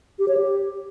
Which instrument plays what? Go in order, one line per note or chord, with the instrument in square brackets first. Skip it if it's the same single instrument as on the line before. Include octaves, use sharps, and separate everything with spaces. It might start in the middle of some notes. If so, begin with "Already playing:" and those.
[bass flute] G4
C#5
G4